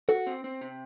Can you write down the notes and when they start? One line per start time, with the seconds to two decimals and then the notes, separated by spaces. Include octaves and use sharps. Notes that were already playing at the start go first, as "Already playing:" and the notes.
0.09 F#4 A4
0.27 C4
0.44 C4
0.61 C3